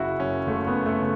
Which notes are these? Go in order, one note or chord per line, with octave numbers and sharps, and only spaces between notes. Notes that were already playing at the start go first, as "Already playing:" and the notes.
Already playing: F#1 C#3 E4 F#4
F#2 C#4
F#1 A3
B3
F#2
A3
C#3